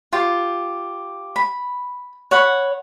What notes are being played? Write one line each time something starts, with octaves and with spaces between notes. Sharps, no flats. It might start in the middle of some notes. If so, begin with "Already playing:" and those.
F4 G4
B5
C#5 F#5 B5